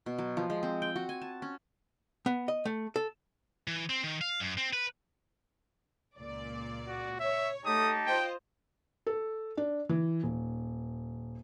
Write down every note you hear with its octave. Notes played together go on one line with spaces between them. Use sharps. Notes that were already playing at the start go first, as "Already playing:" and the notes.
B2
F#3
F3
G#3
C4
G5
F#4
G#5
A5
C#4
B3
D#5
A3
A4
E3
C4
D#3
F5
F#2
C4
B4
C#2 A#2 D5
F#4
C#5 E5
A3 D#4 G4 A5 D#6
F4 C5 D#5 G5
A4
D4
E3
D#1